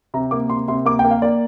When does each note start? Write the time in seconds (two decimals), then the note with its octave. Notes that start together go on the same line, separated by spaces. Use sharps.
0.14 C3 A#5
0.31 A#3 D6
0.50 C3 C6
0.68 C3 C6
0.86 A#3 D6
0.99 G5
1.05 A#3
1.11 F5
1.22 A#3 D5